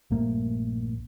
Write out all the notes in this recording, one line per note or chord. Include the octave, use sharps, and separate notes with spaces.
A#1 G2 A3 A#3